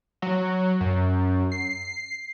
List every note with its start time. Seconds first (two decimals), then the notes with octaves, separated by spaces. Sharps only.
0.22 F#3
0.80 F#2
1.52 C7